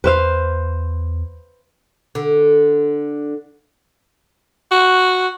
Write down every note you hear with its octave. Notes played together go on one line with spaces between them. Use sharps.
E2 B4 C5 F5
D3
F#4